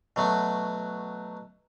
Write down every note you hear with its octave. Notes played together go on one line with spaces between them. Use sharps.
B2 F#3 A3